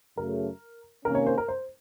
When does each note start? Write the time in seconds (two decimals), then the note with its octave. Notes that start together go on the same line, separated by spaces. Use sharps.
0.17 F#2 C#3 A3 A#4
1.05 C3 D#3 A#3 C#4 A#4
1.15 C#5
1.26 C5
1.38 A#4
1.48 C5